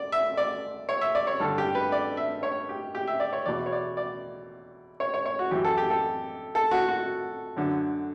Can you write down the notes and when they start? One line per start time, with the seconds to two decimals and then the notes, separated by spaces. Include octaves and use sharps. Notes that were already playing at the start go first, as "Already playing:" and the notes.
Already playing: D5
0.12 E5
0.37 D5
0.89 C#5
1.01 E5
1.15 D5
1.27 C#5
1.40 G2 D3 A4
1.58 G4
1.75 B4
1.92 D5
2.17 E5
2.43 C#5
2.69 G4
2.95 G4
3.07 E5
3.20 D5
3.33 C#5
3.46 E2 B2 D5
3.66 C#5
3.72 D5
3.97 D5
5.00 C#5
5.14 C#5
5.26 C#5
5.39 F#4
5.51 F#2 E3 G4
5.65 A4
5.78 G4
5.90 A4
6.55 A4
6.71 F#4
6.89 F#4
7.57 F#2 D3